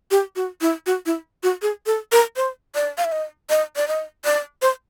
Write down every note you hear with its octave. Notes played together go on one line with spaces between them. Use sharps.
G4
F#4
E4
F#4
E4
F#4
G#4
A4
A#4
C5
D5
F5
E5
D#5
D#5
D5
D#5
D5
C5